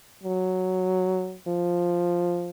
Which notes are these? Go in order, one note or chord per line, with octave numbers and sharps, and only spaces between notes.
F#3
F3